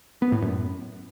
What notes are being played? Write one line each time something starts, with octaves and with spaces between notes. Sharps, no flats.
B3
A2
F#2